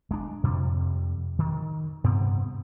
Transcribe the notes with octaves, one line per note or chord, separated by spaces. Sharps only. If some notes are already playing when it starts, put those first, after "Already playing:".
G#3 D4
F2 C3 G3
D#3
G2 C3 B3 C4